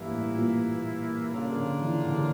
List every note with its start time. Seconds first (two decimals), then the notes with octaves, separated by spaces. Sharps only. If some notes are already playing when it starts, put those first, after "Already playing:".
Already playing: G2 E3 A#3 E4
0.11 A2
0.35 A#2
1.32 C#3 A#3 D4 F4
1.46 C#3
1.57 D3
1.81 E3
2.06 D3
2.15 C#3